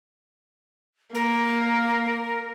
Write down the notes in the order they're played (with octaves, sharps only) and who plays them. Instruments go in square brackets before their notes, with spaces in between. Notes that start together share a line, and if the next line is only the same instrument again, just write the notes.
[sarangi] A#3 [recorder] A#4